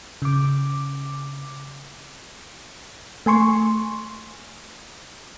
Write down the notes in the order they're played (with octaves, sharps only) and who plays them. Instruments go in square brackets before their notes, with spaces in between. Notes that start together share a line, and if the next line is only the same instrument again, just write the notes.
[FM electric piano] C#3 D6
[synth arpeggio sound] A3 G#5 C6 C#6